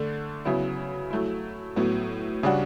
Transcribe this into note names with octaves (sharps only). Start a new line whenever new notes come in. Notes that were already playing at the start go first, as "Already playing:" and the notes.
Already playing: D3 A3 D4
C#3 F#3 B3 E4
F#3 A3 E4
A2 F#3 B3
C#3 G3 D4 F#4